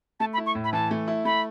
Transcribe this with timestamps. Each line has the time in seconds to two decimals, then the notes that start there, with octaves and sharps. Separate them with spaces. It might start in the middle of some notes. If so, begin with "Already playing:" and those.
0.20 A3 A5
0.33 B5
0.38 E4
0.46 C#6
0.55 A2
0.64 B5
0.73 E3 A5
0.91 A3
1.08 E4
1.25 A3 B5